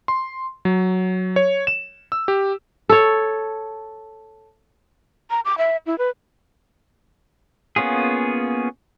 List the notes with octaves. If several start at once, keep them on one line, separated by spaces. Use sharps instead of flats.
C6
F#3
C#5
E7
E6
G4
A4 C#5
A#5
D6
E5
E4
B4
A#3 B3 C#4 F4 G#4